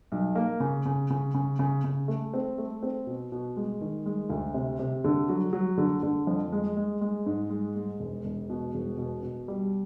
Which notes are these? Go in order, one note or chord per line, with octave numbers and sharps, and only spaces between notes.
B1
A#3
C#3
C#3
C#3
C#3
C#3
C#3
A3
C4
A3
C4
B2
B2
G#3
D#3
G#3
D2
C3
C3
D3
F#3
F#3
D3
D3
F2
G#3
G#3
G#3
G#2
G#3
G#3
E1
E1
B2
E1
B2
B2
G3